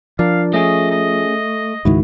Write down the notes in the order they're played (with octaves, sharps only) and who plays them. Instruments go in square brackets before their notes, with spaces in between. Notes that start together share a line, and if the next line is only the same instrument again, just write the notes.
[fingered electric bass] F3 [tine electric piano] D4 A#4 D5 [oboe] F5
[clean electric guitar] A3 [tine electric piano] C#4 G#4 [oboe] D#5
[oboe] D#5
[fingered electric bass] C#2 G#2 D#3 [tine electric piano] E4 F#4